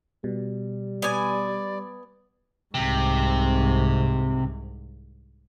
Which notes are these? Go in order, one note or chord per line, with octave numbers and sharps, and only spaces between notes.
B2 G3
B3 D5 G#5
C2 G#2 C3